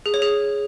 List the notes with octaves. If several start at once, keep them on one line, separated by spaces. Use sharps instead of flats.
G#4
C#5
G#4